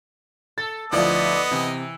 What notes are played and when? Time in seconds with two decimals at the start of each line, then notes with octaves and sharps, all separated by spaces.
0.58 A4 A6
0.92 D2 F3 B3 E4 D5 D#5
1.51 C3 E3